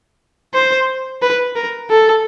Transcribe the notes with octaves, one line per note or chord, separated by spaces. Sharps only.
C5
B4
A#4
A4